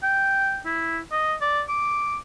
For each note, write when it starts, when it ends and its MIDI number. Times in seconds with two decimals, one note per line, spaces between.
0.03 0.59 79
0.66 0.99 64
1.12 1.34 75
1.41 1.62 74
1.68 2.17 86